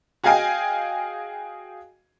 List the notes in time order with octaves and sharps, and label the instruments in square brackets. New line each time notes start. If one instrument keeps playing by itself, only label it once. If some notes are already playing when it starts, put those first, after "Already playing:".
[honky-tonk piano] F#4 G#4 D#5 F5 G5 G#5